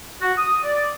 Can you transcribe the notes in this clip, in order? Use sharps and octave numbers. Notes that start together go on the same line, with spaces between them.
F#4
D#6
D5